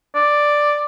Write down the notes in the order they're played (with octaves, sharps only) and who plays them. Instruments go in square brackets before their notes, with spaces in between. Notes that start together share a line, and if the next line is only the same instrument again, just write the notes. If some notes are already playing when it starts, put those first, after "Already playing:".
[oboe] D5